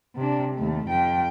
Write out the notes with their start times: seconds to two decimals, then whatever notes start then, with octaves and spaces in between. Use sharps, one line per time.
0.16 C3 D4
0.54 D#2 A3
0.86 F2 G5